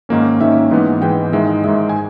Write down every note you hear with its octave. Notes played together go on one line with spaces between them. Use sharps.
G#2 D#3 A#3 C#4
G#2 D#3 A#3 C#4 E5
E5
G#2 E3 G#3 B3
G#2 E3 G#3 B3 G5
G#2 D#3 G#3 E5
D#5
G#2 D#3 G#3 E5
G#5